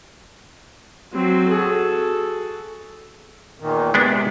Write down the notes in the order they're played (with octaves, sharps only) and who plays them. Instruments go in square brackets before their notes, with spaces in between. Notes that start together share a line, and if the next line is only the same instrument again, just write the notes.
[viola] F#3 C4
[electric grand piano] F#4 G#4 [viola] A4
[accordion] E2 A#2 D#3
[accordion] C3 [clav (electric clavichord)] G#3 B3 D4